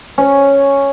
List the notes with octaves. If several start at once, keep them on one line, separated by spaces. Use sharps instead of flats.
C#4